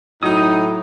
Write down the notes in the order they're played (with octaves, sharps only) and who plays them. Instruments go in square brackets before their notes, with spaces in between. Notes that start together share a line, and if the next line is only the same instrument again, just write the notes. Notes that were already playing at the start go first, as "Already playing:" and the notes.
[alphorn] A2 [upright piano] F#3 [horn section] D#4 [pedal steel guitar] D#6